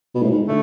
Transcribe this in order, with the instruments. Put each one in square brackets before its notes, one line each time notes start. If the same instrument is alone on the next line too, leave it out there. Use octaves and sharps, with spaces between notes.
[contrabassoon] B2
A2
G#2
[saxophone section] D3 A3